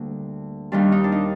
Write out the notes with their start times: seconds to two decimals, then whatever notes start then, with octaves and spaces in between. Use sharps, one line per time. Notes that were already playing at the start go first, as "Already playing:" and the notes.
Already playing: D2 D3 G3 A#3 D4
0.72 D#2 D#3 G3 D4
0.92 D#4
1.04 D4
1.12 D#4